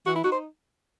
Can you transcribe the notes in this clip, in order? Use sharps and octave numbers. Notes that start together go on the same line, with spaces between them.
E3 F#4
E4
D#4 F#4
C5